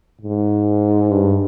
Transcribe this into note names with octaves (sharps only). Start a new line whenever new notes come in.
G#2
G2